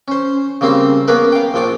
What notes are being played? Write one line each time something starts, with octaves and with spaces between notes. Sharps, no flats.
C#4 C5
C#3 G3 A#3 C4 C5
A#3 B3 C#4 G#4 A#4 B4
F5 G5
A#1 F3 C#5 D5